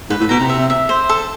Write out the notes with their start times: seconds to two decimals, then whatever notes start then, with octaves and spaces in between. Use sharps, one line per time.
0.10 G#2 B4
0.20 A2
0.29 B2 A#5
0.39 C3
0.49 E5
0.70 E5
0.89 C5
1.09 A4